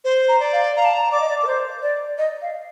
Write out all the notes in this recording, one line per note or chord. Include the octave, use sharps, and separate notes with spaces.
C5
A#5
D5
F5
F5 A#5
A5
A#5
D5 D6
D#5
D5
A#4
C5
D5
D#5
F5